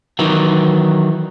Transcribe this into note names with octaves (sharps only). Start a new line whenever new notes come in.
D#3 E3 F#3